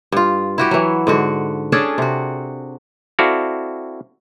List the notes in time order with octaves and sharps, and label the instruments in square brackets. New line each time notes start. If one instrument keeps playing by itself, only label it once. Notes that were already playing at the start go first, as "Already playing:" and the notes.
[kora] G2 F4
E4 F#4 G4
E3 F#3
G#2 D3 F#4
C#4 D4 G#4 A4
C3 F#4
[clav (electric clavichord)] C4 E4 F#4 A4 D5 F5